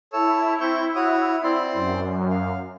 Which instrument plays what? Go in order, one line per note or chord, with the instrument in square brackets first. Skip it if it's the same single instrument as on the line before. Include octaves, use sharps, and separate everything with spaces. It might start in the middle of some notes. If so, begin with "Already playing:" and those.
[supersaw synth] E4 [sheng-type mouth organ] A4 C#5 E6
[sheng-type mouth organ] C4 C#6 G6
F#4 C#5 D#6
C4 D5 C6
[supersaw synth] F#2
[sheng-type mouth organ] F5